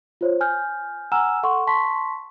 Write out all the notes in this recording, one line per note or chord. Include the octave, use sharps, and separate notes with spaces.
F4 C5 C#5
G#5 F6 G6
F#5 G#5 A#5 E6 F6 E7
A4 F#5 C6 C#6
A5 C6 C#6 B6